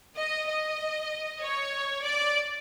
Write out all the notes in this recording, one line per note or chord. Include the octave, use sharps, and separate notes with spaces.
D#5
D#5
C#5
D5